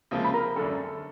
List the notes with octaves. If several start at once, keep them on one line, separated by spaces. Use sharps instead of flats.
C#2 C3 F3 A#3
B5
A#4 A#5
G#1 F#2 D3 A4 A5